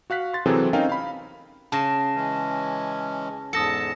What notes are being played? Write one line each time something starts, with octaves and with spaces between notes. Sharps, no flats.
F#4 F5 F#6 B6
C6 A6
C3 E3 F#3 C4 G#4 A4
C4 C#4 D#4 A#4 F5 G5
F5 B5
C#3 A5 A#6 E7
E3 G#3 C#4
E2 G#2 A4 A5 D#6 A#6 C#7